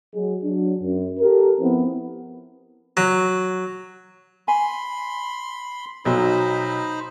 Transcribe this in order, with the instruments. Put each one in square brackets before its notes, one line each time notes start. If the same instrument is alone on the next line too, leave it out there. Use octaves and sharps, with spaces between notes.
[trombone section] F#3 G#3
F#3 D4
F#2
G4 A4 A#4
F3 B3 C4 E4
[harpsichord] F#3
[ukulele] G#5 [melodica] B5 C6
[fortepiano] B1 F#3 [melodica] D#4 C5 B5